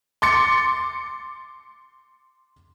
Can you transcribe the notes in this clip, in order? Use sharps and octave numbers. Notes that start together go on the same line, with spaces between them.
C6 D6 A6 C#7